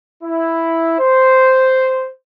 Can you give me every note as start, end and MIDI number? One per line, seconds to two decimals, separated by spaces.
0.23 0.97 64
0.99 2.10 72